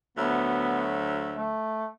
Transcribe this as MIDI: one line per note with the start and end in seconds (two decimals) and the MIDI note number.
0.17 1.54 38
0.17 1.54 54
0.17 1.00 59
0.17 1.54 76
1.36 1.88 57